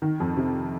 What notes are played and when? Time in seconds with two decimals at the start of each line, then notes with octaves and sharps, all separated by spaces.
0.02 D#3
0.20 F2
0.37 C3